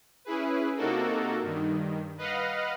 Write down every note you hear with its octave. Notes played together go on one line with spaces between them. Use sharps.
C#4 E4 G#4 B4
C3 A#3 D#4 F#4 A4 A#4
G2 D#3
B4 D#5 F5 F#5